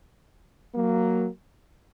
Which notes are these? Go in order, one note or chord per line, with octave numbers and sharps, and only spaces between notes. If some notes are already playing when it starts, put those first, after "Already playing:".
F#3 A#3